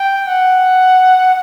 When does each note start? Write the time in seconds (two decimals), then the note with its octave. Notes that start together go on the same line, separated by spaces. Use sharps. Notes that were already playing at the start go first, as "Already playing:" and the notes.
Already playing: G5
0.27 F#5